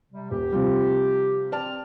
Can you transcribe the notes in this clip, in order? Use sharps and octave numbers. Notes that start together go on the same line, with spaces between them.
C3 G3
D#1 G4
C3 F3 G3
C4 D5 A5 F6